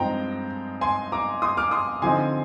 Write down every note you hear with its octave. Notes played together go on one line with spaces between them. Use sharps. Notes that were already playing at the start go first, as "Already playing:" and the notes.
Already playing: G2 F3 G#3 C4 D#4 G5 A#5
G#5 C6
A#5 D6
C6 D#6
D6 F6
C6 D#6
D3 F3 C4 D#4 G#5 C6